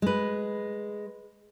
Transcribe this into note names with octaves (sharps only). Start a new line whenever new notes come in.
G#3 B4